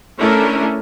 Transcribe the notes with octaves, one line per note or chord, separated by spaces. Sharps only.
A3 C#4 D4 E4 A4 A#4